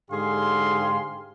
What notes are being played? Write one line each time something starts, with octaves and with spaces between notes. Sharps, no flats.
G#2 D3 G4 G#4 F5 C6